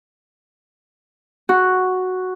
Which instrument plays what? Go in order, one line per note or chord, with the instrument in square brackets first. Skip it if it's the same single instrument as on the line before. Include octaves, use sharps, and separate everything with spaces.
[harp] F#4